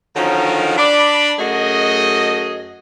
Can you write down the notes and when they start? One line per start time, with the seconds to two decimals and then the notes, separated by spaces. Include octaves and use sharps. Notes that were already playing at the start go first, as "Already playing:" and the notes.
0.16 D3 D#3 F3 F#3 C#4 D#4
0.78 D4 D5 B5
1.38 F#2 A3 F#4 G#4 D#5